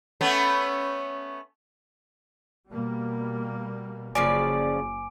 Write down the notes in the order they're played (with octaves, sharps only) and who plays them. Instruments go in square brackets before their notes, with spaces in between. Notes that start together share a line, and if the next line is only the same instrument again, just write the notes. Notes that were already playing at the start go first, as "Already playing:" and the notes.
[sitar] A3 B3 C#4
[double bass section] B2 G3 A#3
[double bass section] F#1 [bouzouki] C#3 F3 D5 [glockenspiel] G#5 D6 D7